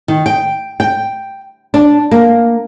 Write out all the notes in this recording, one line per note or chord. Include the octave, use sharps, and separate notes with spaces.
D#3
G5
G5
D4
A#3